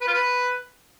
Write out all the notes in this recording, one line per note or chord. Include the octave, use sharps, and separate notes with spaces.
B4
F4
B4